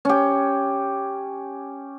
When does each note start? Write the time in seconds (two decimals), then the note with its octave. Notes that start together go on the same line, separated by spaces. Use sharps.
0.05 C#4 G4